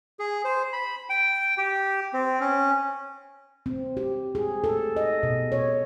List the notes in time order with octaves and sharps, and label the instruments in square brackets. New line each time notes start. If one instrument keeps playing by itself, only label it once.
[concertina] G#4
C5
B5
G5
G4
C4
C#4
[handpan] C4
G4
G#4
A4
D#5
B2
C#5